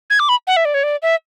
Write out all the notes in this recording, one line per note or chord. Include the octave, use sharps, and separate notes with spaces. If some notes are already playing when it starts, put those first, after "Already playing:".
G#6
D6
B5
F#5
E5
D5
C#5
D5
E5